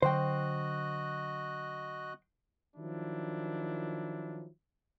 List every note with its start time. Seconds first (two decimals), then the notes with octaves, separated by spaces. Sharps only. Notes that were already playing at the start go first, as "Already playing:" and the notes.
0.02 D3 F#3 F#4 C5 D#5 G5 F#6
2.75 D#3 F3 F#3 D4 E4